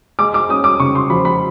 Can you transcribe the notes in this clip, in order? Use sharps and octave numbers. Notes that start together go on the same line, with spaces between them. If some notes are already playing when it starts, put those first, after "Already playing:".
G#3 D6
D6
C#4 D#6
D6
C#3 C#6
C6
F3 B5
B5